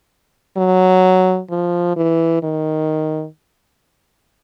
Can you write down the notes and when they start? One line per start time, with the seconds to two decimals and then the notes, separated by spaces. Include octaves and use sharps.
0.57 F#3
1.50 F3
1.96 E3
2.43 D#3